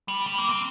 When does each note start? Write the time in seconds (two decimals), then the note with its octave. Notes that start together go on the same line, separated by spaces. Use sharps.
0.08 G3
0.26 G3
0.38 A#3
0.49 C4